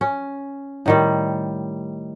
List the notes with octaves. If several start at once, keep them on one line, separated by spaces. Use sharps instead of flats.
C#4
A2 D#3 G3